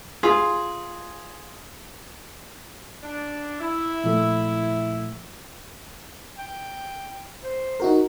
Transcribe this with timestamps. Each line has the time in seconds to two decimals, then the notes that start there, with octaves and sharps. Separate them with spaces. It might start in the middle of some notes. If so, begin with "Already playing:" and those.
0.23 F4 G#4
3.02 D4
3.59 E4
4.04 A#2 F3 A3
6.38 G5
7.44 C5
7.80 D#4 F#4 A#4